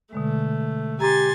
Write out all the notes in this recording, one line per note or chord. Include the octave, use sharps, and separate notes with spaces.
B2 D3 G#3 A3
G4 G#5 A#5 C6 A6